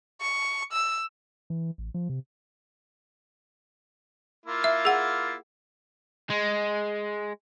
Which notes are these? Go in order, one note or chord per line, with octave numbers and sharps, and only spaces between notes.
C#6
E6
E3
A1
F3
C3
A#3 E4 F4
E5
G#4 F#5
G#3